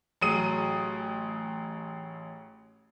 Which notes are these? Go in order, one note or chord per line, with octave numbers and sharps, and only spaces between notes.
A1 F#3 G#4 D#6 D#7